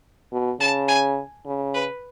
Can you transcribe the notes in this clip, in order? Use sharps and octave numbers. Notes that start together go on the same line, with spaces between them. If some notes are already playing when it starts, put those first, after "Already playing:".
B2
C#3 A5
G#5
C#3
B4